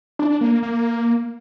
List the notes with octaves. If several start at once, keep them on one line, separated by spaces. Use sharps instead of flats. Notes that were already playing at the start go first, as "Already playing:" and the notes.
D4
D4
A#3
A#3
A#3